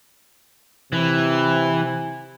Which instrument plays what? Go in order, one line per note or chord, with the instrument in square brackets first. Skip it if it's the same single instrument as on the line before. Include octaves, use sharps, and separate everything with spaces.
[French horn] C3 [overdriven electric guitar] E3